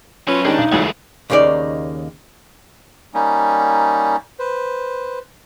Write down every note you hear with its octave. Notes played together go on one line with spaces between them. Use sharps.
F#3 C#4 F4 B4
D#3 G3 G#3 D4 D#4
B1
D2 E3 F#3 G#3 A3
D#2 C#3 A#3 D#4 D5
G3 A#3 C#4 D#4
B4 C5